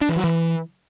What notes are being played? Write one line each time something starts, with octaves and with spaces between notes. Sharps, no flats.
D4
E3
F#3
E3